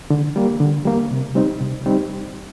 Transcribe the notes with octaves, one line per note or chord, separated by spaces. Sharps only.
D3
G3 A#3
D3
G3 A#3
C3
G3 C4 D#4
C3
G3 C4 D#4